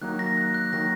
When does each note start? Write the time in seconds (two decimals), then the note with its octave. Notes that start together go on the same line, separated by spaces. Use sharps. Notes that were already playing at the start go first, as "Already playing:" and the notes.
0.01 D#3 F#3 A#3 D#4 F#6
0.19 A#6
0.37 F#6
0.54 F#6
0.72 D#3 F#3 A#3 D#4 A#6